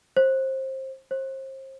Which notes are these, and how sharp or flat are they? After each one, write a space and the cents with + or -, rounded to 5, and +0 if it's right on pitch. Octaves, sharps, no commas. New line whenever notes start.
C5 +25
C5 +35